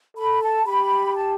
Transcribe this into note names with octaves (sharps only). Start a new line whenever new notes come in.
A4 B5
A5
G4 B5
A5